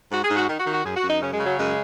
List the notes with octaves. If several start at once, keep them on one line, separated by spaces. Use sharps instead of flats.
G#2 F#4
G#4
G#2
F#4
D#3
F#4
D#3
F#4
F#2 G#4
F#4
F#2
D#4
C#3 C#4
G#3
C#3
F#3
F#2 G#3